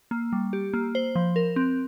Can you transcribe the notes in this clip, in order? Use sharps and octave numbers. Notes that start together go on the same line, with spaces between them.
A#3
G3
G4
A#3
C5
F3
A#4
C4